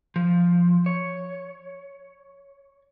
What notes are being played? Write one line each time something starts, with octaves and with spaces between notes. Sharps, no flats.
F3
C#5